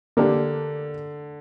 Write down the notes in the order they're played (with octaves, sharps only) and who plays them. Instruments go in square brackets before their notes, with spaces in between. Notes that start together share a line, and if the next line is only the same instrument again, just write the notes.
[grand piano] D3 [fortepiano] A#3 D4 G4